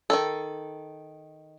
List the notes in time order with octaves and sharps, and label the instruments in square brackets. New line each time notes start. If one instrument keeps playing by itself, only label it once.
[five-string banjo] D#3 G#3 A4